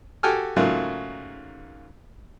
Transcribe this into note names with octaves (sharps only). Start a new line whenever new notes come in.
F#4 G4 A4 G5 G#5 F6
G#2 C#3 F#3 A3 A#3 F4